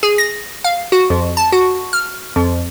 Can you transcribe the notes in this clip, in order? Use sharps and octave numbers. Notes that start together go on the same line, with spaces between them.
G#4
A#6
F5
F#4
F2
A5
F#4
F6
F2